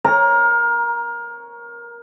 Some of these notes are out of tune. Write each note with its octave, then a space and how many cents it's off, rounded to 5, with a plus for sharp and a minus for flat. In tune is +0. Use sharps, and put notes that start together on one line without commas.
A#4 +20 C#5 +0 A#5 +0